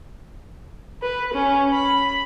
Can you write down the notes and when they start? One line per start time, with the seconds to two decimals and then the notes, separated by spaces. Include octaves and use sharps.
1.02 B4
1.34 C#4
1.73 B5